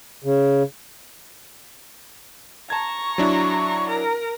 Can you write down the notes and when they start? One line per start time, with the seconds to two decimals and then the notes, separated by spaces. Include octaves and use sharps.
0.24 C#3
2.70 A5 A#5 C#6 G#6
3.18 F#3 D4 E4
3.89 A#4 A#5